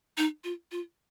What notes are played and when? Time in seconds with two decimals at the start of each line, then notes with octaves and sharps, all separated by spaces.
0.17 D#4
0.44 F4
0.72 F4